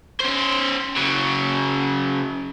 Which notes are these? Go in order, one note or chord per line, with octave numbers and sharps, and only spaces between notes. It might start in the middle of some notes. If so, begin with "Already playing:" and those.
C#4 C5
C#3 F#3